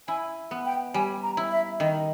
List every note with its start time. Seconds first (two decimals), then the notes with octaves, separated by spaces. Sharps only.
0.08 E4 G#5
0.51 B3
0.66 G5
0.94 G3 G#5
1.23 A#5
1.37 E4
1.51 E5
1.80 D#3 D#5